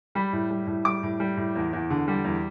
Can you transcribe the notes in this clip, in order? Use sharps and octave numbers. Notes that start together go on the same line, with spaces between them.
G3 B5
A2
G3
A2
G3 D6
A2
G3
A2
E2
E2
D3
G3
E2